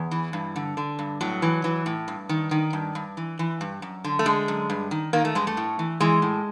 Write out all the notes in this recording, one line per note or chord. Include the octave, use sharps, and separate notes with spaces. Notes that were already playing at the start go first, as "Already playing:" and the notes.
Already playing: E2
E3
G2
D3
D3
G2
A2 F#3
E3
E3
A2
G2
D#3
D#3
G2
G2
E3
E3
G2
F#2
D3
A3
D3 G#3
F#2
G2
D#3
D#3 A#3
A3
G2 G#3
A3
A2
E3
E3 G#3
A2